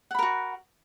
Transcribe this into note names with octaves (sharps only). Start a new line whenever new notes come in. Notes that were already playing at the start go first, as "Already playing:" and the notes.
F#4 A#4 F#5 B5